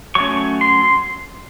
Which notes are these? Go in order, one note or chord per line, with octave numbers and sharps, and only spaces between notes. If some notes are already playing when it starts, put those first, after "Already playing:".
F#3 A3 C#4 C#6
C6